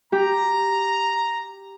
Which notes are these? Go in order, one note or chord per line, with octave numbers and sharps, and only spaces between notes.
G4 A#5